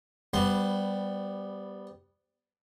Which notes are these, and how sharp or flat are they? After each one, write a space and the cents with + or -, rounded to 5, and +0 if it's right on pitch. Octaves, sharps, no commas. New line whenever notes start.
G3 +0 B3 +0 C5 -25